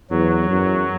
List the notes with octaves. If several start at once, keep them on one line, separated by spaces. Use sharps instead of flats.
E2 F#3
F#2